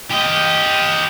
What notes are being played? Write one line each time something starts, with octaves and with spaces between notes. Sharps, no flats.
G4 D#5